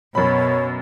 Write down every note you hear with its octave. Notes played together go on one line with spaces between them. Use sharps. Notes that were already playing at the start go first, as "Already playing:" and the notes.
F#2 B2 C#5 B5